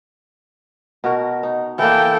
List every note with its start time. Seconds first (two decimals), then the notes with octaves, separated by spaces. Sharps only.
1.04 B2 F#4 A#4
1.43 D#4
1.79 E3 A#3 A4 G5